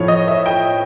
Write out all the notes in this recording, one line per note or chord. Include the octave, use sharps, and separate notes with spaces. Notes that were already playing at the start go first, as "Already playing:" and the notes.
Already playing: A2 F3 C#5
D#5
E5
G5